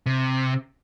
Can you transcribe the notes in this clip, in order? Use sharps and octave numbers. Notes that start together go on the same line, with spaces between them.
C3